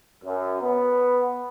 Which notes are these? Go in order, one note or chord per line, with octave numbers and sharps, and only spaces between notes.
F#2
B3